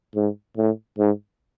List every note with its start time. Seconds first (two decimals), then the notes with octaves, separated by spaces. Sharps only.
0.16 G#2
0.57 A2
0.98 G#2